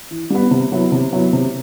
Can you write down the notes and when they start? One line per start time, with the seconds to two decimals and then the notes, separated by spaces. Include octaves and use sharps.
0.11 E3
0.30 G3 B3
0.51 C3
0.72 F#3 B3 E4
0.92 C3
1.13 F#3 B3 E4
1.33 C3